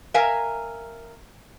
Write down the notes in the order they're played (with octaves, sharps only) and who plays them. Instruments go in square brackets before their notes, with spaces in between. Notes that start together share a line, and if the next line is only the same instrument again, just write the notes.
[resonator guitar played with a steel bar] A#4 E5 F5 G#5 A#5